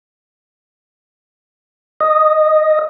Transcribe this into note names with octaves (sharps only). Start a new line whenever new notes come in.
D#5